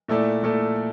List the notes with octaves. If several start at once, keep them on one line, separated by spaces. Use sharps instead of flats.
A#2 A3 E4 A4 D5
A#2 A3 E4 A4 D5